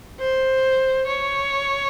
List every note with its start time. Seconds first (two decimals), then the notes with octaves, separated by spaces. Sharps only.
0.20 C5
1.07 C#5